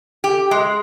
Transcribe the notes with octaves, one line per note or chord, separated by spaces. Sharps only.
G4
G#3